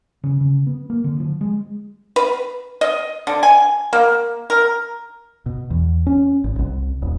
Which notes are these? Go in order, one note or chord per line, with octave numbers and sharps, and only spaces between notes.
C#3
C#3
B3
A#3
D3
F3
G#3
B4
D#5
D3
G#5
A#3
A#4
B2
E2
C#4
G#1
C2
D#1